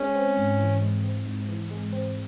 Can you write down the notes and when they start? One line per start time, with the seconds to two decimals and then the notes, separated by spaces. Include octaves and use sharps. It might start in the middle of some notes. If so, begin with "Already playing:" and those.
Already playing: G#3 C#4
0.15 C4
0.37 G#2
0.59 E3
0.82 G#3
1.04 C4
1.26 G#2
1.48 E3
1.71 G#3
1.93 C4